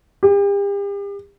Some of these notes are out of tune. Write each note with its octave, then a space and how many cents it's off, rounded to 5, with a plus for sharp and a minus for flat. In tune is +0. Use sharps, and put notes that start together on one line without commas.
G4 +40